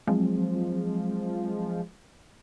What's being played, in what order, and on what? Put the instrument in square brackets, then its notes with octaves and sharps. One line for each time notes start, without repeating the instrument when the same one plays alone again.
[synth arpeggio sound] F3 G#3 [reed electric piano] F#3 C4